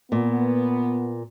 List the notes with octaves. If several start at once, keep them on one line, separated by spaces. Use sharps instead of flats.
A#2 B3